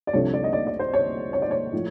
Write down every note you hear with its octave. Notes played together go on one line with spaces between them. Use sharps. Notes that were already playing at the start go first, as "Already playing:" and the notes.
D5
C2 C3 F3 A3 D4 C#5
D5
D#5
D5
D5
C5
C#5
C#5
D5
C#5
A2 F3